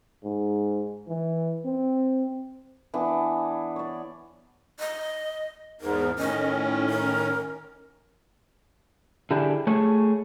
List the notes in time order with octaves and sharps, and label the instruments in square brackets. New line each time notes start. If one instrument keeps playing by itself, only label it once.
[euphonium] G#2
E3
C4
[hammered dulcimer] E3 B3 D4
C#5 D5
[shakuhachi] D#5
[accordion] E2 G#2 [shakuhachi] A#4
[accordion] A2 D#3 C#4 [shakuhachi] D#5
[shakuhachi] A#4
[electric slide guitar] D3 D4 E4 G4 G#4
A3 G#4 C#5